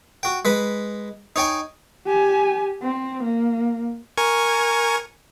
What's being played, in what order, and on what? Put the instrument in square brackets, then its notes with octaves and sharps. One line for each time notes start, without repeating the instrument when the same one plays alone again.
[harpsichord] F#4 G5
G#3 B4 B5
D#4 C#5 G5 G#5
[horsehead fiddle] G4 G#5
C4
A#3
[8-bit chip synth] A#4 G#5 C#6